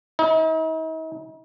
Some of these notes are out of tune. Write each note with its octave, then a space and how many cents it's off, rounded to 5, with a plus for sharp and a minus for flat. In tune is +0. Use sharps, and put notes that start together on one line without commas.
D#4 +45